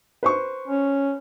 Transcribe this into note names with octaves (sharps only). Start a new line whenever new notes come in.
B4 C5 C#6
C#4